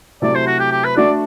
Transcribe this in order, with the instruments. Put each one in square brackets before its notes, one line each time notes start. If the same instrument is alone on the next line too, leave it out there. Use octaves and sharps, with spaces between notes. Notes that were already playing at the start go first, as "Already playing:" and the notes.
[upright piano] C3 F#3 A3 E4 [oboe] D5
[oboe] C5
F#4
G4
G4
B4
[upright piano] A3 D4 F#4 A4 [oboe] D5